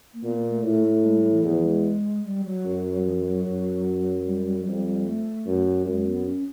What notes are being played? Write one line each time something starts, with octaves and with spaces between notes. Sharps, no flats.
A#3
A#2 B3
A#3
A3
A2 A3
A3
G#3
G3
E3
E2 F3
G#3
G3
F#3
F#2
F3
F#3
F#2
G3
G3
F#3
F2 G3
G3
A3
F#2
F#2 G#3
B3
C#4